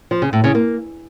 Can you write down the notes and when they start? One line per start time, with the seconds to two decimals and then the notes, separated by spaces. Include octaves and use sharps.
0.11 F3
0.22 C#3
0.33 A2
0.44 C#3
0.55 A#3